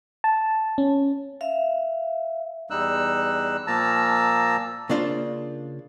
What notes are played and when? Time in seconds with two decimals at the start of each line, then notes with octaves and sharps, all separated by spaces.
0.24 A5
0.78 C#4
1.41 E5 F5
2.70 E2 G3 D#4 E6 F#6
3.67 A#2 F3 A#3 A5 A#5 E6
4.90 C#3 A#3 D4 F4 C5